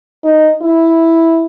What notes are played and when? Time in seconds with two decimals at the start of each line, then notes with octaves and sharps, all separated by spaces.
0.24 D#4
0.62 E4